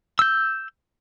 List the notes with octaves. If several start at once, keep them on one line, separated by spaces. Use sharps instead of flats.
E6 G6